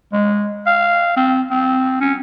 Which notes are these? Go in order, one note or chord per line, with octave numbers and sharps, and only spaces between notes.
G#3
F5
C4
C4
C#4